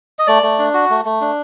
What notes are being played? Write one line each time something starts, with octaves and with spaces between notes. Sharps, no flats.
D#5
A3 D5
A3
D4
F#4
A3
A3
D4